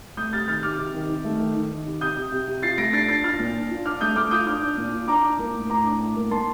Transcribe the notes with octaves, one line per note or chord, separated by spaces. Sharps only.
A3 D#6 G6
C3 F6 A6
D#3 F6 A6
C3 D6 F6
C3
D#3
D#3
A3
D#3
D#3
D#3
C3
C3 D#6 G6
C3
C3
C3
F4 A6 C7
A3 A#6 D7
D4 A6 C7
D4 A6 C7
F4 F6 A6
A#2
D4
F4
D4 D6 F6
A3 D#6 G6
A3 D6 F6
F4 D#6 G6
D4 D6 F6
D4
A#2
F4
D4 A#5 D6
D4
A#3
A2
A2 A#5 D6
D4
A2
A#3
A#3 A5 C6